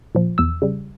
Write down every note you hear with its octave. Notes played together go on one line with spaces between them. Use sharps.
A#2 F3
E2 E6
C#3 G3